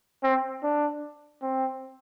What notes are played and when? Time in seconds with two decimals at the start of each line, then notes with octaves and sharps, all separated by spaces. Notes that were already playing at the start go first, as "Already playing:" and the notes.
0.23 C4
0.63 D4
1.42 C4